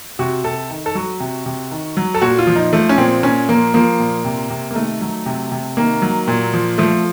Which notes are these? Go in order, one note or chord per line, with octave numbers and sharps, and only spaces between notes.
C3 F#4
C3 A4
D#3
A4
F#3 F#4
C3
C3
D#3
F#3
A4
A#2 F#4
F4
F3
D#4
F3 A3
C#4
A#2 C4
A#2 C#4
F3 A#3
F3 A#3
A#2
C3
C3
A#3
D#3 A3
F#3
C3
C3
D#3 A#3
F#3
A#2
F3
F3 A3